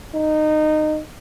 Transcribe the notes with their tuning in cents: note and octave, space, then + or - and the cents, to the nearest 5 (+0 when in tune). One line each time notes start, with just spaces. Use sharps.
D#4 -20